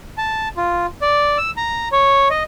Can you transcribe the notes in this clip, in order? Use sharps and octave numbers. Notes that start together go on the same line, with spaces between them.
A5
F4
D5
E6
A#5
C#5
D#5